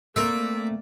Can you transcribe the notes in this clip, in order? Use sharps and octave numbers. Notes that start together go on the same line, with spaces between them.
A3 A#3 C4 A#4 D5 E5